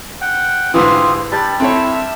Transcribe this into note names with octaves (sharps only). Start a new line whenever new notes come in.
F#5 G5
G#2 D3 E3 F4 G4 E5 D#6 E6
G3 D4 G4 B5 A6
C4 E4 A4 C#5 E5